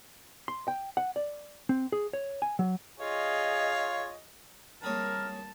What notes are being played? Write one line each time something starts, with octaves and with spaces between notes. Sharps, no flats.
C6
G5
F#5
D5
C4
G#4
C#5
G#5
F#3
F4 G#4 C#5 D#5 F5
G3 A#3 C4 G#4 A#4 C#5 A5